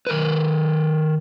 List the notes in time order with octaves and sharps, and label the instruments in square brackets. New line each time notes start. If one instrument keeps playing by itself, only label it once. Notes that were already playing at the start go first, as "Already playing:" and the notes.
[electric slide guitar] D#3 A#4 B4